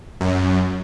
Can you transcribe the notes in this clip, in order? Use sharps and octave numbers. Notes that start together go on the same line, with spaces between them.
F#2